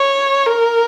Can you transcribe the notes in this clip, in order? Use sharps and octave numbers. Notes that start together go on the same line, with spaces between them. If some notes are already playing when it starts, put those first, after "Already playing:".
Already playing: C#5
A#4